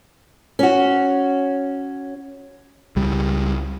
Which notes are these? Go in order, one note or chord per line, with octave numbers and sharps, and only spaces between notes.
C#4 F#4
C#2 G3